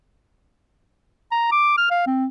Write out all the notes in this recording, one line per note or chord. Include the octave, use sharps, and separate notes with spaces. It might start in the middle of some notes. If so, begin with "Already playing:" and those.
A#5
D6
F6
F5
C4